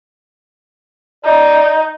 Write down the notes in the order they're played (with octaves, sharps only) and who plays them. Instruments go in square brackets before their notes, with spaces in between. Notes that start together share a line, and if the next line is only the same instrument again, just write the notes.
[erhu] D#4 [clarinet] D5